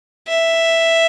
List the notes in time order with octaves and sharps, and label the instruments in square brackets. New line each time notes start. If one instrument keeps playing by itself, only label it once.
[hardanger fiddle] E5